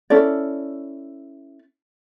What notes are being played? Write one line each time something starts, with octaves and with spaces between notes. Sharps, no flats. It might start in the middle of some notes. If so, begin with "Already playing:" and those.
C#4 E4 A4 D5